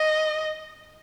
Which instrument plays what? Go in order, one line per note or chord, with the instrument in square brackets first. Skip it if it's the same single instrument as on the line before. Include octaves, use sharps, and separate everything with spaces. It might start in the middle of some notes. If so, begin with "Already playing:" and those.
Already playing: [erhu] D#5